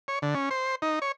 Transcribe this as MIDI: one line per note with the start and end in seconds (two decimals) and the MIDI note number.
0.08 0.19 73
0.22 0.34 50
0.35 0.49 61
0.51 0.75 72
0.82 0.99 63
1.02 1.12 73